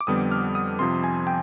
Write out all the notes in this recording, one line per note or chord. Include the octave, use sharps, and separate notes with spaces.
D6
F2 D3 G3 B3 D#6
F6
D#6
F2 C3 F3 C6
G#5
G5